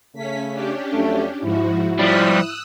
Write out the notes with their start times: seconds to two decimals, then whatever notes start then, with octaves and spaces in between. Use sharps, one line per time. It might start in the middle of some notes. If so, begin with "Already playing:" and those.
0.14 C#3 A3 C#4 B6
0.51 C#4 D4 G4
0.92 F2 F#3 A3
1.42 G#2 F3 E4 F#4
1.99 F3 G3 D#6 E6 F#6